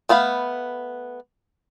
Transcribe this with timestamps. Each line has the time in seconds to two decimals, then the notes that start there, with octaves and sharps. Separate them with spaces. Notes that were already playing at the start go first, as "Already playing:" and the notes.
0.09 A3 B3 F5 B5